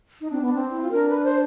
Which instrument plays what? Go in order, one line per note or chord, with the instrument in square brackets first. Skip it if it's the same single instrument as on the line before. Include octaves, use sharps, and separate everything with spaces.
[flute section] D#4
[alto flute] C4 [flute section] D4
[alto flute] B3 [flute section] D4
[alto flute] C4
[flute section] E4
F4
[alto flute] D4 [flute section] A#4
[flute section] B4
C5